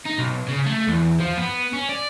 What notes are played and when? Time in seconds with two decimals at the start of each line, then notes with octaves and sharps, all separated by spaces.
0.06 D#4
0.19 B1
0.49 C#3
0.67 A3
0.88 E2
1.20 F3
1.38 B3
1.73 C#4
1.89 D5